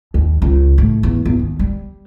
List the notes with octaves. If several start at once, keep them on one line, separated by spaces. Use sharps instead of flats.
D#2
C#2
A2
E2
E2
D#2
G3